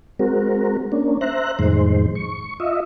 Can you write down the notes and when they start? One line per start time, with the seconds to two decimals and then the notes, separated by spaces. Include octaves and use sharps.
0.19 G#3 C4 F#4 A#4
0.92 A#3 C#4 D4
1.21 C5 E5 A#5 F#6
1.59 F2 A2 D#3 G#3 C5
2.15 C#6
2.60 F4 D#5 E5